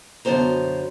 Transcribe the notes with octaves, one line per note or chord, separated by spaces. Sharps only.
F#2 B2 D3 C#4 C5 A#5